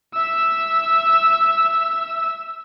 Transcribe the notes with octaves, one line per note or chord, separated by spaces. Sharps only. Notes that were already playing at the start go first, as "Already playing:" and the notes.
E5 E6